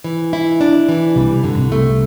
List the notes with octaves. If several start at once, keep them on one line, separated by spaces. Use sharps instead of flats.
E3
E4
D4
E3
C2 C3 G3
G2 D3
C2 C3
C2 C3 A3